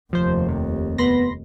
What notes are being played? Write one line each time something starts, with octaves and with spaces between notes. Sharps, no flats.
F1 D#2 F3 C5
C3
B3 B5 C6 A#6